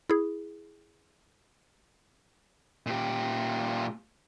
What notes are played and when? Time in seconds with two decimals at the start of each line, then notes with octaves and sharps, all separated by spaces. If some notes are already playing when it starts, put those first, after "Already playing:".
0.10 E4 G#4
2.86 A#2 G4